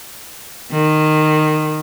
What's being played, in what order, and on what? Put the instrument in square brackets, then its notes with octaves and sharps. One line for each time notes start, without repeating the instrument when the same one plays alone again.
[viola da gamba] D#3